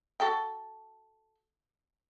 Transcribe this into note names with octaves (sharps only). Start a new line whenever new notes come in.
F#4 A4 G5